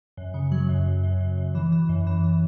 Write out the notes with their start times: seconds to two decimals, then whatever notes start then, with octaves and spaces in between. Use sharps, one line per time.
0.17 F#2
0.34 C#3
0.52 F#3
0.69 F#2
0.86 F#2
1.04 F#2
1.21 F#2
1.38 F#2
1.55 E3
1.72 E3
1.89 F#2
2.07 E3
2.24 E3